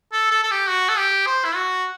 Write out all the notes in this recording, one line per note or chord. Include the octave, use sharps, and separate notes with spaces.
A4
A4
A4
G4
F#4
A4
G4
C5
E4
F#4